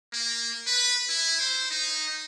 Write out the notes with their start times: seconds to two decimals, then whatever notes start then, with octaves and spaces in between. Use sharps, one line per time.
0.13 A#3
0.67 B4
1.09 E4
1.40 C5
1.71 D#4